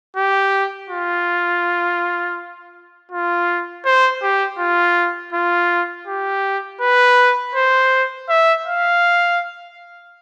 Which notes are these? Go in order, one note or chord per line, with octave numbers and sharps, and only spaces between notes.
G4
F4
F4
C5
G4
F4
F4
G4
B4
C5
E5
F5